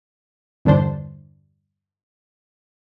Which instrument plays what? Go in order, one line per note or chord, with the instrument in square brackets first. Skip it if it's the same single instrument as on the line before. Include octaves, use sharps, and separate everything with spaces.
[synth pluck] E2 G2 D3 D4 C5